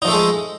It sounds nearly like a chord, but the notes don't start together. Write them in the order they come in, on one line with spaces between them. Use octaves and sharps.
D#4 F3 A3 A4 G#3